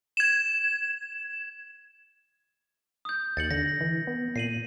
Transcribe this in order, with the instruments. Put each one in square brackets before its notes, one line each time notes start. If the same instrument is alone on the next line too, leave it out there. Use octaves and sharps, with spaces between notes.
[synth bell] G#6 E7
[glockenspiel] D#6 G6
[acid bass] D#2 [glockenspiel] A6 C#7 F#7
[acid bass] D3 [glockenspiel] A#6
[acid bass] E3
B3
[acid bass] A#2 [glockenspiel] C7 D#7 F#7